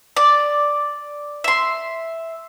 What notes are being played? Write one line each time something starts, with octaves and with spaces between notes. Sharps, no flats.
D5
E5 C6